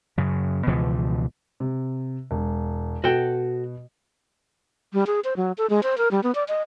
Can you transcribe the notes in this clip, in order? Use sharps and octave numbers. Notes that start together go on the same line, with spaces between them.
F#2 C#3
C#2 B2 E3 F3
C3
E1
B2 F#4 A4 G5
G3
G#4
C5
F#3
A4
G#3
C5
A#4
G3
B3
D5
D#5